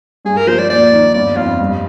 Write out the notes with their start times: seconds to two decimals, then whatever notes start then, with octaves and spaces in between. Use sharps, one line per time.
0.25 G2 G#4
0.37 A#4
0.47 F3 C5
0.58 D5
0.69 D#2 D5
0.93 D#3
1.14 G1 D5
1.36 F2 F4
1.60 G2